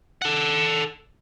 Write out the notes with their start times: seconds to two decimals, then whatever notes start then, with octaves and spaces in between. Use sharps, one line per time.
0.22 A4 F#5